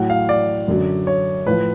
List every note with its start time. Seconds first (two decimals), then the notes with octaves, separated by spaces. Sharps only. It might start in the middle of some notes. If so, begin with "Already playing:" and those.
Already playing: A2 F#3 F#5
0.10 F5
0.29 D5
0.68 F#2 D3 F#3
1.07 C#5
1.47 A2 F3 B4